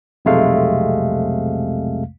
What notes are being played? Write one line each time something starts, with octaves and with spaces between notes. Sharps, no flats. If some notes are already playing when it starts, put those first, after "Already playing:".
B1 F2 C3 G#3 A3 F5